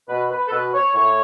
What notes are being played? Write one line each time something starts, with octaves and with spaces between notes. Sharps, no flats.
B2 B4
B4
A4
B2 B4
C#5
A2 C#5